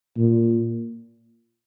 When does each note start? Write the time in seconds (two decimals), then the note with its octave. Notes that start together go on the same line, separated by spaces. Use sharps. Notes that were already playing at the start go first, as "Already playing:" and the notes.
0.18 A#2